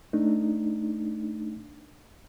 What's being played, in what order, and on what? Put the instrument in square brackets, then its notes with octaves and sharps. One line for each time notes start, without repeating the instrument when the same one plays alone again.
[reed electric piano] A3 D4 D#4